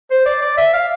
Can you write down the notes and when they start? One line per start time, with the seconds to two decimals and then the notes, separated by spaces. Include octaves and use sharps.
0.11 C5
0.26 D5
0.41 D5
0.57 E5
0.73 F5